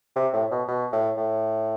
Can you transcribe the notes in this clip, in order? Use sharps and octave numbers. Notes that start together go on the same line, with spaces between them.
C3
A2
B2
B2
A2
A2